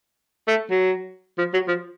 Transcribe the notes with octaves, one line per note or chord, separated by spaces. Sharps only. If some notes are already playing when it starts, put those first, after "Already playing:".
A3
F#3
F3
F#3
F3